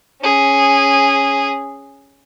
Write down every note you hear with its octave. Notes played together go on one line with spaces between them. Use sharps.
C#4 G#4